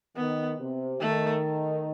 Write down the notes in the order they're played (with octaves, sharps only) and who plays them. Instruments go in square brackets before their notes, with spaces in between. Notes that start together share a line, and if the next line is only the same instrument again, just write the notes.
[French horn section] D#3 [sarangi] B3
[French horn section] C3
[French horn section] D#3 [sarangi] A3